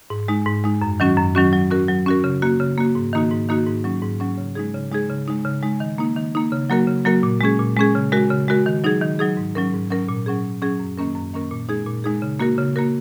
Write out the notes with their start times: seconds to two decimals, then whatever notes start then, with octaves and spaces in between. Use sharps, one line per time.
0.10 G#2
0.28 G#3 D#4
0.46 G#2
0.64 G#3 D#4
0.82 F#2
1.00 D#3 F#3 C#4 F#4
1.17 F#2
1.35 D#3 F#3 C#4 F#4
1.53 F#3
1.70 C#4 F#4 A#4
1.88 F#3
2.06 C#4 F#4 A#4
2.24 C#3
2.42 A#3 F#4
2.60 C#3
2.78 A#3 F#4
2.95 G#2
3.13 D#3 A#3 D#4 F#4
3.31 G#2
3.49 D#3 A#3 D#4 F#4
3.67 G#2
3.84 F#3 C#4
4.02 G#2
4.20 F#3 C#4
4.37 C#3
4.55 G#3 D#4 G#4
4.74 C#3
4.92 G#3 D#4 G#4
5.09 C#3
5.28 G#3 D#4
5.45 C#3
5.62 G#3 D#4
5.80 D#3
5.98 A#3 D#4
6.16 D#3
6.35 A#3 D#4
6.52 C#3
6.70 F#3 A#3 F#4 A#4
6.87 C#3
7.05 F#3 A#3 F#4 A#4
7.23 A#2
7.41 G#3 C#4 G#4
7.59 A#2
7.77 G#3 C#4 G#4
7.95 C#3
8.12 G#3 F#4 A#4
8.30 C#3
8.48 G#3 F#4 A#4
8.66 D#3
8.84 F#3 D#4 G#4
9.01 D#3
9.19 F#3 D#4 G#4
9.37 G#2
9.55 F#3 C#4 A#4
9.73 G#2
9.90 F#3 C#4 A#4
10.09 A#2
10.26 F#3 C#4 G#4
10.44 A#2
10.62 F#3 C#4 G#4
10.79 F#2
10.98 D#3 A#3 C#4 A#4
11.15 F#2
11.34 D#3 A#3 C#4 A#4
11.51 A#2
11.69 G#3 D#4 G#4
11.87 A#2
12.04 G#3 D#4 G#4
12.22 C#3
12.40 A#3 F#4 A#4
12.58 C#3
12.76 A#3 F#4 A#4